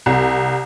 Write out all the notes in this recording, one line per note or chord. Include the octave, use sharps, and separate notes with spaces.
C2